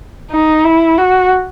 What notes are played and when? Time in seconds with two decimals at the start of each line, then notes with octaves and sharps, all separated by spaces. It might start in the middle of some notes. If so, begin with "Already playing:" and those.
0.31 D#4
0.64 E4
0.98 F#4